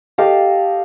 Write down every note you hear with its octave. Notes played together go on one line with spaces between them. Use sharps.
G4 A4 D#5 F5